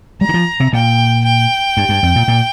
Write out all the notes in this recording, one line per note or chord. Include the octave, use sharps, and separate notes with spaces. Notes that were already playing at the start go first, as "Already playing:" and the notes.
G3 A#5
D#3
F3
C3
A#2 G5
G5
G2
G2
F2
A#2
A#2